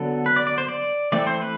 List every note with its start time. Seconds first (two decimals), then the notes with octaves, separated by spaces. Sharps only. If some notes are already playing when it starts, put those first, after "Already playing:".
Already playing: D3 F#3 B3 A4
0.26 B4
0.36 D5
0.47 D5
0.58 C5
0.69 D5
1.12 E3 A3 C4 D5
1.27 C5
1.41 B4